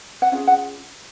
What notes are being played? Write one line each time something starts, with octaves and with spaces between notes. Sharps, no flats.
F#5
C#4 F4 G#4 F5
F#5